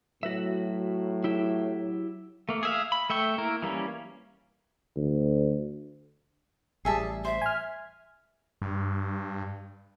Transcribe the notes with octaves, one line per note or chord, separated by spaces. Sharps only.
A2 F#3 F#4 B4 E5
E4 G4 E5
A3 A#3
G#4 E5 F5
B5
A3 E5 G5 C#6
A#3 E4 A#4
E3 G3 A#3 C#4
D2
A1 G3 G#4 E5 A5
C5 E5
G#5 F6
G2